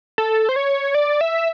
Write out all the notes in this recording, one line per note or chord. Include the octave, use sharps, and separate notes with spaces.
A4
C5
C#5
D5
E5